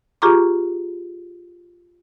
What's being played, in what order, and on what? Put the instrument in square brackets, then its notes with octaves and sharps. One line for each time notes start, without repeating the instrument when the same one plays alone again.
[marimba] F4 G4 G#4 A#5 C#6 D6